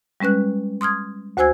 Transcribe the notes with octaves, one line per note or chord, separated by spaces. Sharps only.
G3 G#3 C#4 B4 F#6
C6 D#6 F6 G#6
D2 F#4 C5 G#5 E6 G#6